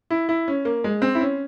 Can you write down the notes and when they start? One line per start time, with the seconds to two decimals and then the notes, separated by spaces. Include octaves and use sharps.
0.10 E4
0.29 E4
0.48 C#4
0.65 A#3
0.84 G#3
1.02 C4
1.15 E4
1.21 C#4